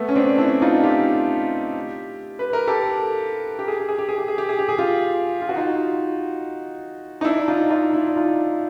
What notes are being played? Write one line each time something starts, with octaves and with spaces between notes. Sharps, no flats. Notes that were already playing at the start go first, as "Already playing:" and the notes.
Already playing: A3 B3
C#4
C4 D4
D4 E4
D#4 F4
F4 G4
B4
A#4
G4 A4
G4
G#4
G4
G#4
G4
G#4
G4
G#4
G4
G#4
G4
G#4
F4 G4
F4
F#4
D#4 F4
D#4
D4 E4
E4
D#4 F4
D#4 F4
D4 E4
D#4 F4